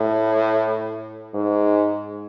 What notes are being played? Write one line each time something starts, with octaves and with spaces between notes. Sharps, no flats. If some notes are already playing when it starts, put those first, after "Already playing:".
Already playing: A2
G#2